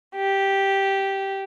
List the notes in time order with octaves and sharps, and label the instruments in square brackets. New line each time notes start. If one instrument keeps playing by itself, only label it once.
[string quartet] G4